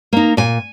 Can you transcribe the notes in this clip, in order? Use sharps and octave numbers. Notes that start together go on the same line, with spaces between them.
A#3 D#4
A#2 G#5